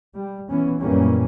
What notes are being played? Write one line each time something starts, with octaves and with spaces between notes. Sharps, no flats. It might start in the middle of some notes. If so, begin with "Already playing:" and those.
G3
E3 B3 C#4
F#2 A#2 E3 G3 A#3 C#4